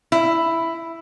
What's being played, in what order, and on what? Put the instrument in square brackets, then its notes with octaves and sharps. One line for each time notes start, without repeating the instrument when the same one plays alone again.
[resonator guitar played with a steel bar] E4